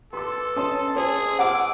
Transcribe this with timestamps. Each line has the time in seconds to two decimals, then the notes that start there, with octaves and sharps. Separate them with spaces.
0.13 A4 B4 C6 D6
0.56 C#4 D#5 A5 C6
0.96 G#4 C5
1.39 F#5 D6 E6 F6